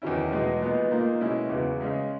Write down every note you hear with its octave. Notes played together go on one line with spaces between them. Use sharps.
E2 D#3 F#3 C#4 E4
E2 B2 G#3
A#2 G#3 B3 D#4
A#2 A#3 D#4
B2 G#3 C#4 E4
E2 C#3 F#3 B3 E4
C#3 G#3 C#4